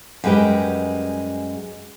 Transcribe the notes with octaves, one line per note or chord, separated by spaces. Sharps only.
F#2 G3 G#3 B4 G5